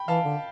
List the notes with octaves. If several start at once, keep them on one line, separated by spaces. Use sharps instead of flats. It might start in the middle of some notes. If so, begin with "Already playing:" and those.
Already playing: G5 B5
E3 F5 A5
D3